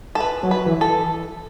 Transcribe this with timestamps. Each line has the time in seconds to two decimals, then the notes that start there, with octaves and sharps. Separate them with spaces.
0.15 A4
0.20 B4
0.43 F#3
0.51 B4
0.66 E3
0.81 A4